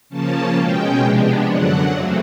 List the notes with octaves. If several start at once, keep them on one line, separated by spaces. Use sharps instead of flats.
C#3 F3 A#3 C#4 A5
B2 G#3 C#4 G5
C3 F3 G#3 B3 D4
F#2 D3 F#3 F#5
E2 C#3 F#3 A3 C4